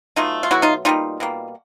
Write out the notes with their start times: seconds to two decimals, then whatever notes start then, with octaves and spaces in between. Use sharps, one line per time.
0.16 B2 F#3 A3 D#4 F4
0.43 F4
0.51 B2 F#3 A3 E4 F#4
0.62 D#4 F4
0.85 B2 G3 A#3 D#4 F4
1.20 B2 G3 A#3